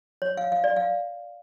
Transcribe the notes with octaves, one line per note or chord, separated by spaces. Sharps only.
C#5
F5
F5
D5
F5